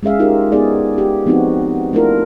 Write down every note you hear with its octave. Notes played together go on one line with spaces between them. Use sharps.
G#3 C#4 G#4 E5 F5
D#4 F4 G4 A#4
B3 D#4 G#4 D5
G4
F3 B3 C4 D#4 F#4
A3 D4 E4 F4 A#4